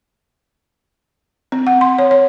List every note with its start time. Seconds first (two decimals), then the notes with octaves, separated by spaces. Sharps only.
1.52 C4
1.67 F#5
1.81 C6
1.99 C#5
2.11 C#5